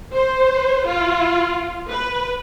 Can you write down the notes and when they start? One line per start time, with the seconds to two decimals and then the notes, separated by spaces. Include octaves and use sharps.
0.13 C5
0.86 F4
1.89 B4